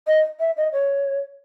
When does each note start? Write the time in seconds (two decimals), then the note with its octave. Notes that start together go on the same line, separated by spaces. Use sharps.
0.07 D#5
0.40 E5
0.57 D#5
0.73 C#5